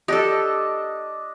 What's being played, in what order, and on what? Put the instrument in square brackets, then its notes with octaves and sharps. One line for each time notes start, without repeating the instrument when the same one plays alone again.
[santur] D4 D#5 [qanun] G4 A4